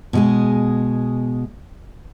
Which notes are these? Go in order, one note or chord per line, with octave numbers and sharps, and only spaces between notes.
B2 G#3 G#4